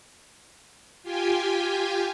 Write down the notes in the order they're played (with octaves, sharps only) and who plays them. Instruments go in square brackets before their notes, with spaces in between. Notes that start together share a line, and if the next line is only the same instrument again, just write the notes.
[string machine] F4 G4 G5 G#5